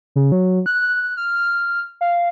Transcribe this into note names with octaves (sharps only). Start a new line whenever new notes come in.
C#3
F#3
F#6
F6
F5